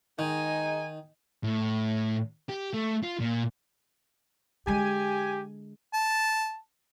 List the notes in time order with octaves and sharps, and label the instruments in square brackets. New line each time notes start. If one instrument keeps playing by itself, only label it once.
[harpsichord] D#3 [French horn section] G#3 D#4 [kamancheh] G#5
[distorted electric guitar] A2
G4
A3
F4
A#2
[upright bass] D3 G#3 [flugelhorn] G4 [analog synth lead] G#5
[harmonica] A5